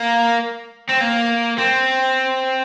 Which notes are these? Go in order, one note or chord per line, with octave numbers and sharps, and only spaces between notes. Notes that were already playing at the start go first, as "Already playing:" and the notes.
Already playing: A#3
C4
A#3
C4